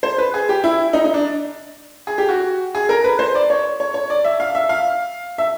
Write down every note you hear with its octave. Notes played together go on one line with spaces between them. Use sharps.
C5
B4
G#4
G4
E4
D#4
D#4
D4
G#4
G4
F#4
G#4
A#4
B4
C5
D5
C#5
C#5
C#5
D5
E5
F5
E5
F5
E5